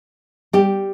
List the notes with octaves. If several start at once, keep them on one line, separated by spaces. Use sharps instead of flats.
G3 G4